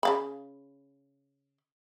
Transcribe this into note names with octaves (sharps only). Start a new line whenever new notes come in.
C#3 F5 B5